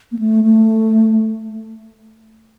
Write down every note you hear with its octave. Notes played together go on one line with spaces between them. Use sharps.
A#3
A3
A3